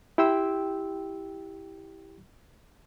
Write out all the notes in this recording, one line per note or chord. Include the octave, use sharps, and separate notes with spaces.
E4 G4 G5 C6 E6